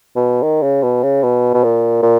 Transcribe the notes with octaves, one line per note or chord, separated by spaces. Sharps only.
B2
D#3
C#3
B2
C#3
B2
B2
A#2
A#2